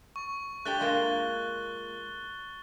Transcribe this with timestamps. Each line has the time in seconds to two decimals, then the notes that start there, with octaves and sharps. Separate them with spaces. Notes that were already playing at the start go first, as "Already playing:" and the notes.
0.16 C#6
0.65 A3 D4 G4 F#6 A6 G7
0.80 A#2 G#3 A#3